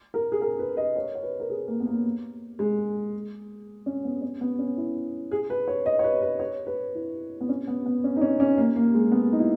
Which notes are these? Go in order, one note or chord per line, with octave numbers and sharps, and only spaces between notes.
A#4
G#4
A#4
B4
D#5
C#5
C#5
B4
A#4
G#4
A#3
B3
A#3
G#3
C#4
B3
C#4
B3
C#4
E4
G#4
B4
C#5
D#5
C#5
B4
B4
C#5
B4
E4
B3
C#4
B3
B3
C#4
D#4
C#4
C#4
A#3
A#3
G#3
B3
D#4
E4